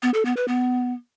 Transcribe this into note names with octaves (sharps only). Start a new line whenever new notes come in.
B3
A4
B3
B4
B3